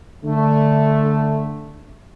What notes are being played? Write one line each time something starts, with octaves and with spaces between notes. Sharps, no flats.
D3 A3